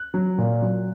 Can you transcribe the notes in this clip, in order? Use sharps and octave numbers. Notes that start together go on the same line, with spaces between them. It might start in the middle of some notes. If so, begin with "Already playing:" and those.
Already playing: F#6
F#3
A#2
F#3